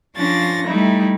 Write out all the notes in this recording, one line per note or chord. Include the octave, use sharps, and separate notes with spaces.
F3 C#4 D4 A6 A#6
G3 A3 D#4 E4